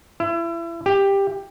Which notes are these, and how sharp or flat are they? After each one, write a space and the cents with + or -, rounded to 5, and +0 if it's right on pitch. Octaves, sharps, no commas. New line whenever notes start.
E4 +30
G4 +10